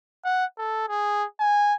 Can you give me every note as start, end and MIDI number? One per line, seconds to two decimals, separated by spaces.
0.25 0.45 78
0.58 0.84 69
0.89 1.24 68
1.40 1.74 80